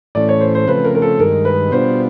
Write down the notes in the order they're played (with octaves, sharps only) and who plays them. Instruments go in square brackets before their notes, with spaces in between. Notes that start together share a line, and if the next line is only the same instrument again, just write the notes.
[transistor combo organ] A2 E3 A3 C#4 [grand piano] D5
[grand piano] C#5
C5
C5
[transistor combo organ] C#3 F3 A3 C4 [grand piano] B4
[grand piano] A#4
A#4
A4
[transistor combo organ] G2 D#3 G#3 [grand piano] A#4
[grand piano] B4
[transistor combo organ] B2 G3 B3 D4 F4 [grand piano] C5